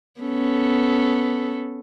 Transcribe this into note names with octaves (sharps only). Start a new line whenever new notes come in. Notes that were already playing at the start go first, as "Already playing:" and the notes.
B3 C#4 A4